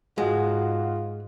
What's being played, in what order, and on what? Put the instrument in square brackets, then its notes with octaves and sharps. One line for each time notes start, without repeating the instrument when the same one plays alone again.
[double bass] G#2 [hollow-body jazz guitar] G#3 [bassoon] F4 [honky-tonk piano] F#4 D#6